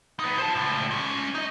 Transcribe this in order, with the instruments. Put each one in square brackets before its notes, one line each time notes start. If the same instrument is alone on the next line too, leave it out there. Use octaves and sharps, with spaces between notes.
[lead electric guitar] D#4 B4
C5 A5
C#2 A2
G#3 C#4
D#4 D#5